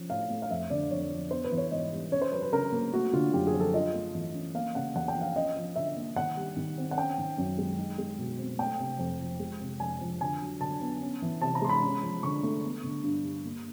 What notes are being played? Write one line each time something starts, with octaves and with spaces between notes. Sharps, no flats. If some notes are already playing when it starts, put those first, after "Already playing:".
Already playing: F3 C#4
A2 F5
A3
F5
F2 E5
D3 D5
F2 C#5
F3
B3 C5
B4
E3
C#5
G#2 D#5
G3
C#4 C#5
C5
F#3 B4
B4
C#3 A#4
A#3
A3 F#4
D3 F4
F#2 G4
G#4
F3
A4
F4 D#5
A3
E3
C#4
A#3 F5
C#3 F#5
E2 F#5
G5
F3
F5
C#4 D#5
F3
D3 E5
A#3
D#3 F#5
G3
D#3
C4
F#5
C#4 G5
D#3
F#2
G#3
D#4
G#3
B2
C4
A3 G5
C3
F2
F3
G#3
C3
F2 G#5
F3
D3 G#5
F#3
D3 A5
B3
C#4
E3
C3 A5
A#5
G#3 C6
B5
C#4
F3
D3 C#6
A3
B3
D3
G2
G3
A#3